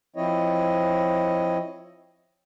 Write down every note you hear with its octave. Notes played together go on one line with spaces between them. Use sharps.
F3 C4 E4 C#5 D#5